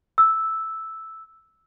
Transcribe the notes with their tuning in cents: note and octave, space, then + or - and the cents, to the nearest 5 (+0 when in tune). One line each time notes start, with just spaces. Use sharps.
E6 -5